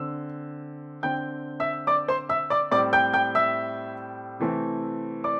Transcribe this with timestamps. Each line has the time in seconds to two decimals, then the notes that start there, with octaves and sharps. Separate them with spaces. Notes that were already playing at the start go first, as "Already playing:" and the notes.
Already playing: D3 C4 E6
1.03 D3 C4 G5 G6
1.60 E5 E6
1.87 D5 D6
2.08 C5 C6
2.29 E5 E6
2.50 D5 D6
2.71 A2 G3 C4 D5 D6
2.93 G5 G6
3.13 G5 G6
3.35 E5 E6
4.39 C3 E3 A3 C4
5.24 D5 D6